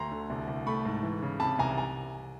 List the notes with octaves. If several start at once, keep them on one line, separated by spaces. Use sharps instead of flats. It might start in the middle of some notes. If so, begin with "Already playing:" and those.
Already playing: D2 A#5 C6
D3
C2
C2
A3 B5 C#6
G#2
E3
C#3
C3 A5 B5
C2 G#5 A#5
G#5 A#5